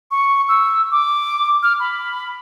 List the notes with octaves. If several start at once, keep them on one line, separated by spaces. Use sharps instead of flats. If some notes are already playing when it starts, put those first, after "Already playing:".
C#6
E6
D6
F6
B5